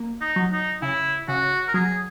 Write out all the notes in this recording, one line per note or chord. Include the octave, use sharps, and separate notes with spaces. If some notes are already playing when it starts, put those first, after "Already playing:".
Already playing: A#3
D#4
F#3
D#4
C#3 E4
C#3 F#4
A#4
F#3 G#4